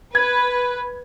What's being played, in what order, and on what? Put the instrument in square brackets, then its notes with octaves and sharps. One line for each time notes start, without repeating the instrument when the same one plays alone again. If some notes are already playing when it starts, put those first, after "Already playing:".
[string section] B4 [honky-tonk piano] G#6